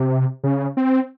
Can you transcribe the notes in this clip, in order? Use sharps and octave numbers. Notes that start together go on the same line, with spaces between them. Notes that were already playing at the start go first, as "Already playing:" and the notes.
Already playing: C3
C#3
C4